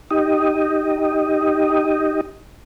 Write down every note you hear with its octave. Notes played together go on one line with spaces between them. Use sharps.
D#4 G4 D#5